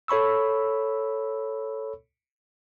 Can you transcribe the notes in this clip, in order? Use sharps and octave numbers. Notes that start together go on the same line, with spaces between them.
A4 C#5 B5 C#6 E6